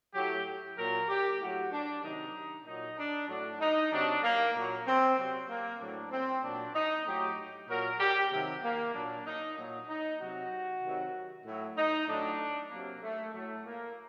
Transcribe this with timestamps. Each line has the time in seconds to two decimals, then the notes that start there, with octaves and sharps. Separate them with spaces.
0.15 A2 F#3 G4
0.77 A#2 F#3 A#4
1.09 G4
1.40 A2 F#3 F#4
1.72 D4
2.03 C3 D#3 F#3 D#4
2.65 A#2 F#3 D#4
2.97 D4
3.28 A2 F#3 D4
3.60 D#4
3.91 C3 F#3 D4
4.23 A#3
4.54 A#2 F#3 A#3
4.86 C4
5.17 C3 F#3 C4
5.49 A#3
5.80 A2 F#3 D4
6.11 C4
6.42 A#2 F#3 D4
6.74 D#4
7.06 A2 F#3 G4
7.68 A#2 F#3 A#4
8.00 G4
8.32 C3 D#3 F#3
8.63 A#3
8.93 A#2 F#3 D4
9.26 D#4
9.57 A#2 F#3
9.88 D#4
10.20 C3 F#3 F#4
10.83 C3 D#3 F#3
11.45 A2 F#3
11.77 D#4
12.08 A2 F#3 D4
12.70 C3 F#3 A#3
13.02 A3
13.34 A2 F#3 A3
13.65 A#3